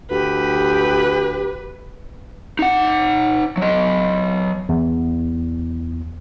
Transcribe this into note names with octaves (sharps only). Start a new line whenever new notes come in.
D2 G4 B4
D#4 F#5
F#3 D#5
E2